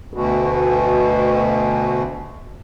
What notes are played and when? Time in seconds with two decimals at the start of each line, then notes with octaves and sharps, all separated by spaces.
0.14 D2 B2